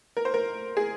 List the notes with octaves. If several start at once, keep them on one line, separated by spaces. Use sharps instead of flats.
A#4
C5
A#4
G#4